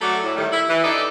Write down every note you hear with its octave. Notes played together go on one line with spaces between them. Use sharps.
F#3 A3 C#4 F#4 A4 D5
A2
D#3 G3 A3
E4
E3
D4 D#4 G4 A4 D5 D#5